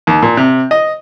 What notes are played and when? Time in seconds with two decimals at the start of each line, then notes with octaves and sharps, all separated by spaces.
0.07 D#2
0.22 A#2
0.37 C3
0.71 D#5